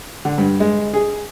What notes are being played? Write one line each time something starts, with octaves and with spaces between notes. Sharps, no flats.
D3
G2
G#3
G#4